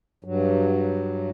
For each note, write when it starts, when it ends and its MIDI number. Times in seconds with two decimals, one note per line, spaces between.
0.24 1.30 43
0.24 1.30 54